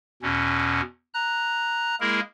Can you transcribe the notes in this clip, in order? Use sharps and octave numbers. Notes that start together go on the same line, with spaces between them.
E2 B2 C#4
A#5 F#6
G#3 A#3 E4 G#4 A#4